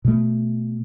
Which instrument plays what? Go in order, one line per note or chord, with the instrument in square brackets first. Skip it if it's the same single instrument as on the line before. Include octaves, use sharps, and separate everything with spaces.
[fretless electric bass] B2 A3